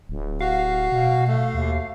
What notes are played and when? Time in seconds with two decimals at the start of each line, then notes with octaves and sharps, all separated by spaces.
0.09 D1
0.41 F#4 F5
0.92 B2
1.27 A3
1.54 D#2